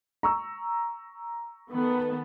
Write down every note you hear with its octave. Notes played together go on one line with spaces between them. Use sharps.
A#5 C#6 E6
D#3 B3 A4